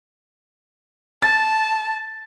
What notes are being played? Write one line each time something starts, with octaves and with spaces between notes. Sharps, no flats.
A5 A6